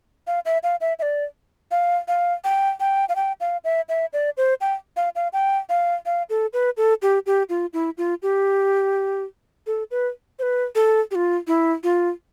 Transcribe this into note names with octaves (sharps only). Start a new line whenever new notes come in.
F5
E5
F5
E5
E5
D5
F5
F5
G5
G5
F5
G5
F5
E5
E5
D5
C5
G5
F5
F5
G5
F5
F5
A4
B4
A4
G4
G4
F4
E4
F4
G4
A4
B4
C5
B4
A4
G4
F4
E4
F4